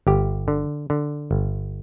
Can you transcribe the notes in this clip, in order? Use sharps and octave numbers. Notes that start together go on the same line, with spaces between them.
G1 G4
D3
D3
G1